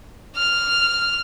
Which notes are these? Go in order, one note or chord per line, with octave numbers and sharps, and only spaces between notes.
F6